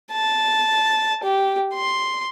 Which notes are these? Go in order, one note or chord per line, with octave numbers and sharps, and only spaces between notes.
A5
G4
C6